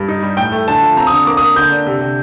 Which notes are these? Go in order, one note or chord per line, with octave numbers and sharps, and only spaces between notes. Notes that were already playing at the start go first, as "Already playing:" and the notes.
Already playing: G2
D#4
G3
A2 G5
A3
D3 A5
F3
C4 A#5
D#6
D3
A#3 D6
D#6
A#3
D3 G6
D4
C3
C3